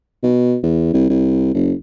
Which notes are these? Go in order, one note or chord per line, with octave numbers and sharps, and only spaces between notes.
B2
E2
C2
C2
F#1